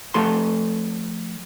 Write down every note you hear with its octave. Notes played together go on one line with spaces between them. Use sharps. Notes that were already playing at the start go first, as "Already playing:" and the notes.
F3 A3 A4 C6